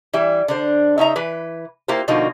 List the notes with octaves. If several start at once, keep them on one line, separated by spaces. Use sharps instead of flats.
E3 G3 E5
D3 D4 C5
C#3 D#4 E5 A#5
E3 B4
A#3 E4 F4 G4 C5
B2 D3 F3 A#3 D#4 F#4